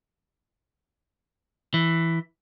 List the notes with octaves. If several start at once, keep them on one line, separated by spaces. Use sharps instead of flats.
E3